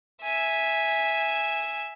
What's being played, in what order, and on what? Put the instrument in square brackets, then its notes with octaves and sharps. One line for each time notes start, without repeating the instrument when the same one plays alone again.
[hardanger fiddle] E5 G#5